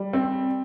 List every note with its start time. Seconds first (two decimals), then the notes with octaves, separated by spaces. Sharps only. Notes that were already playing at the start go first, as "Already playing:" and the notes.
Already playing: G3
0.13 C4